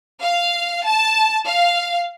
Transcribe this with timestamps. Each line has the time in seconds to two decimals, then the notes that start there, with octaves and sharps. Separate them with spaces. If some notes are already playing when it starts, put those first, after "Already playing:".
0.22 F5
0.86 A5
1.46 F5